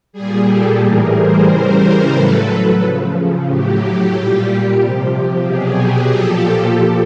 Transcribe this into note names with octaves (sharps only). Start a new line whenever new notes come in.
G3 G#4
A#2
G4 A4
A2 E3 G3 G#4 A#4
A#4 C5
C#3 E3 G3 A#4 C5
A2 F#3 A4 B4
C#3 F3
A2 F#3 G4
A#2 G3
C3 F3
B2 F#3 G#4
A#2 F3 G4 A4